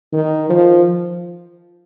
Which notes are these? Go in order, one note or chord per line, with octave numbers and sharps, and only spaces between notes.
D#3
F3